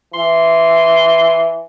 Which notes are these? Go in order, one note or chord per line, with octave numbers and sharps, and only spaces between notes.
E3 C6